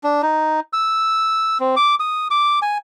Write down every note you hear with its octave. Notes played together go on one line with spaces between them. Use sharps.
D4
D#4
E6
C4
D6
D#6
D6
G#5